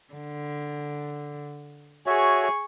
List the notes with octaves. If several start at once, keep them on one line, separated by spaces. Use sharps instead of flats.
D3
F#4 G#4 C#5 E5 C#6